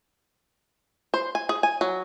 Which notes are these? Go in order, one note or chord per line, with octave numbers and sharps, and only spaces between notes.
C5
G#5
G#4
G#5
F#3